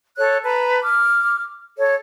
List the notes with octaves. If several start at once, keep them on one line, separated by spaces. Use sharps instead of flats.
A4 C#5 F#6
B4 A5 A#5
D6 F6
A4 C#5